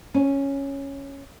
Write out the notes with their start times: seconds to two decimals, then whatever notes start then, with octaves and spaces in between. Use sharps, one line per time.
0.14 C#4